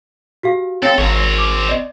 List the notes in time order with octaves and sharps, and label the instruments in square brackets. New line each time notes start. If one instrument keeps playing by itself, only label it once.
[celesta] F#4 G4 F5
[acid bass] C4 [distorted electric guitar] A4 [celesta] C#5 F5
[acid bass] G#1 [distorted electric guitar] C4 C#5 [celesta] C#6
[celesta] D6
D5 D#5